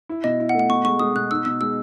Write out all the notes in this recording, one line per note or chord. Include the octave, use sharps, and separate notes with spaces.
E4
B2 D#5
E4
F#5
A3
F#5
B2 C#6
G#3 C#6
G#3 D#6
B2 F#6
D#4 E6
B2 E6
G#3 E6